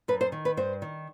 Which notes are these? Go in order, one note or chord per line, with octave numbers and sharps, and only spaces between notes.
F#2 B4
C5
D#3
B4
G2 C5
D#3